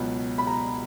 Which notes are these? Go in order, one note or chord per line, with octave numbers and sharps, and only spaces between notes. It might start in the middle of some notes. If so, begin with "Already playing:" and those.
Already playing: C#2 B2 F#3
B5
A#5